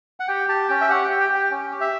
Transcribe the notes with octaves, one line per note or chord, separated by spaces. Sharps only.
F#5
G4 G5
G4 A5
C#4 G5
E5
G4 F#5
G4 G5
G5
G4
G5
C#4
G4
E5